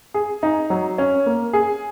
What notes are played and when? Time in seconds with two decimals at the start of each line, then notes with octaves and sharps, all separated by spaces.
0.14 G#4
0.43 D#4
0.70 F#3
0.98 C#4
1.26 A#3
1.53 G#4